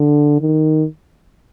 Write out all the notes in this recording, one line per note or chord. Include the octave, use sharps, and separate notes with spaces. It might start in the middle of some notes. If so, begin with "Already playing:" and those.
Already playing: D3
D#3